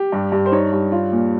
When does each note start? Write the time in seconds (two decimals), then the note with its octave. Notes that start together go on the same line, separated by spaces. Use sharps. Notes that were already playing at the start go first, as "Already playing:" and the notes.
Already playing: G4
0.12 G2
0.32 G2
0.46 C5
0.52 D#4 C#5
0.73 G2
0.92 F4
1.12 A#2